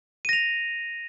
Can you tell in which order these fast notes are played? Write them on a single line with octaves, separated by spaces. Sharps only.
D#7 A#6 F7